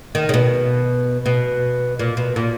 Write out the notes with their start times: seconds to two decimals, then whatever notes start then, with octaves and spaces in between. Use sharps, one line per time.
0.15 D#3
0.29 C#3
0.34 B2
1.26 B2
1.99 A#2
2.17 B2
2.36 A#2